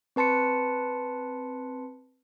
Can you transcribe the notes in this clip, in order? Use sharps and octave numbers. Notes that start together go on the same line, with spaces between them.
C4 B4 A5 C6 C#7